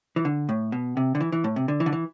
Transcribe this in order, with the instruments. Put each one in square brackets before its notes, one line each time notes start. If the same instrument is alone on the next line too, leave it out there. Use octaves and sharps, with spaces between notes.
[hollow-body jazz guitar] E3
D3
A2
B2
C3
D3
E3
E3
A2
C3
D3
E3
D3
E3